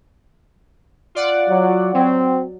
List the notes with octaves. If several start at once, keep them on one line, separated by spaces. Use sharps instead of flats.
F4 D5 F#5
F#3
F#3 C4